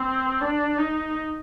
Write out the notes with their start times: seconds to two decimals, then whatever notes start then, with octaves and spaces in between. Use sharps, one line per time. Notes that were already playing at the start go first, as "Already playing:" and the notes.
Already playing: C4
0.41 D4
0.78 D#4